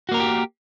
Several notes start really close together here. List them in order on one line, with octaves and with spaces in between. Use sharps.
F#4 A#3 A#4 B3 G4